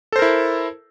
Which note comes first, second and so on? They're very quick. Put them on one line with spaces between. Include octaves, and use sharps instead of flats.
A4 C5 A#4 E4